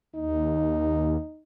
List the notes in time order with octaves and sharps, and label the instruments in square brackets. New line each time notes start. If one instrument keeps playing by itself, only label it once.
[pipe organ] D#2 [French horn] D#4